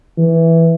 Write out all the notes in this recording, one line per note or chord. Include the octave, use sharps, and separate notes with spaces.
E3